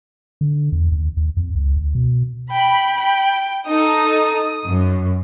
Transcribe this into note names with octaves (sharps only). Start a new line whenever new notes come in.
D3
E2
D#2
D#2
F2
C#2
D2
B2
G5 B5
G5
D#4 A4 D#6
F#2